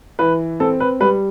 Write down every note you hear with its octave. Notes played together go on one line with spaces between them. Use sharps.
E3 B4
C4 A4
B4
G3 B4